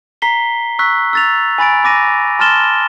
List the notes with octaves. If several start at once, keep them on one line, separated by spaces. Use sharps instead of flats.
A#5 B6 C7 G7
C#6 E6 F#6 B6
E6 A6 F7
G#5 B5 A6 D7
B5 D6 A#6 D#7
A5 C6 F6 A6 E7 G7